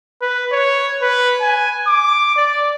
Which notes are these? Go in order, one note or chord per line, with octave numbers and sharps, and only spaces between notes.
B4
C#5
B4
G#5
D6
D5